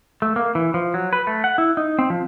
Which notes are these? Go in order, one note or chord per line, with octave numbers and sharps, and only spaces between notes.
A3
A#3
E3
F3
F#3
B4
A3
F#5
E4
D#4
C4
F3